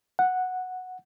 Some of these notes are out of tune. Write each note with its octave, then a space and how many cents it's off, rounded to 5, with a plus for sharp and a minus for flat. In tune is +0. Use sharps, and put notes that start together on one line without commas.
F#5 -5